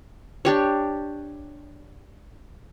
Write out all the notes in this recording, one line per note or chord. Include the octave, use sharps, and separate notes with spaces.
D4 G4 C#5